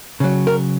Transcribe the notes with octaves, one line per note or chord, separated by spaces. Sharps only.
C#3 F#3
A#4